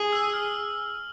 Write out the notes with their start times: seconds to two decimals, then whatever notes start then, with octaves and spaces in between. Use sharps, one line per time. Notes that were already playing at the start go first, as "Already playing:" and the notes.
Already playing: G#4
0.13 E6
0.34 F6